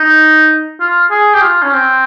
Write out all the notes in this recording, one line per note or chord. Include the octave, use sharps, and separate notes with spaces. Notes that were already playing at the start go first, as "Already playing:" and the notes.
Already playing: D#4
F4
G#4
G4
F4
C#4
C4